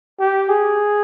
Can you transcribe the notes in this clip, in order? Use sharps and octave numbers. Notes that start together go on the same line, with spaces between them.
G4
G#4